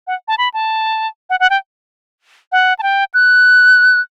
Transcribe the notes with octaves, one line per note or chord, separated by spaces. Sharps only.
F#5
A5
B5
A5
F#5
F#5
G5
F#5
A5
G5
F#6